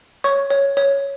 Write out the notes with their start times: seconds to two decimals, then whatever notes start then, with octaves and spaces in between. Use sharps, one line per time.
0.24 C#5 C#6
0.50 C#5
0.77 C#5